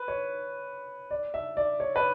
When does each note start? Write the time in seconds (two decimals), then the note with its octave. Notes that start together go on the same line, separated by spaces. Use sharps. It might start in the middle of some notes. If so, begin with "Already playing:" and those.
Already playing: B4
0.08 C#5
1.11 D5
1.34 E5
1.57 D5
1.80 C#5
1.96 B4